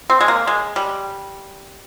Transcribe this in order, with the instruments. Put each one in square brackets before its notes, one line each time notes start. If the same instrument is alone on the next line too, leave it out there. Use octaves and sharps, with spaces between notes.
[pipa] C4
G#3
A#3
G#3
G3